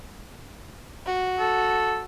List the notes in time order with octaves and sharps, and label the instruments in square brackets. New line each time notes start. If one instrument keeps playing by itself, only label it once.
[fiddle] F#4
[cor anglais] A4